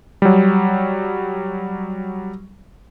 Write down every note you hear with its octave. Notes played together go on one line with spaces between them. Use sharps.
F#3 G3